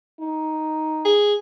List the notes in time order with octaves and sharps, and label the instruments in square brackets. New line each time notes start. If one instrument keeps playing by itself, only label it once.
[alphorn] D#4
[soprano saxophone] G#4